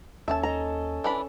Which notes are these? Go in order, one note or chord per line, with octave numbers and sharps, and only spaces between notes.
D#2 C#4 A4 E5 A5
A4 D#5 A#5
E3 D4 B5